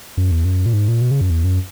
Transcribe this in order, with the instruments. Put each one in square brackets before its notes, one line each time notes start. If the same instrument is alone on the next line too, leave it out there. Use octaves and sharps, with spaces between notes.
[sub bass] F#2
E2
F#2
A#2
G#2
A#2
B2
C#3
F#2
E2
F#2